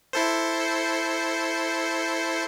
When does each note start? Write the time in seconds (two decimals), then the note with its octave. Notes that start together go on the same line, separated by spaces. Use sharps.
0.13 E4 A4 C5